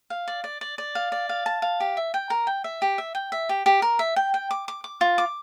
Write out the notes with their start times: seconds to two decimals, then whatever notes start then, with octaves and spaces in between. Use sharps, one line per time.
0.10 F5
0.28 D5
0.44 D5
0.61 D5
0.78 D5
0.95 F5
1.12 D5
1.29 F5
1.46 A5
1.62 F5
1.80 G4
1.97 E5
2.14 G5
2.30 A#4
2.47 G5
2.64 E5
2.82 G4
2.98 E5
3.15 G5
3.32 E5
3.49 G4
3.66 G4
3.82 A#4
3.99 E5
4.16 G5
4.34 G5
4.51 D6
4.68 D6
4.84 D6
5.01 F4
5.18 D6